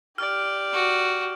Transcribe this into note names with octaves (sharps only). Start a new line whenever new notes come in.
G4 D5 F6
F#4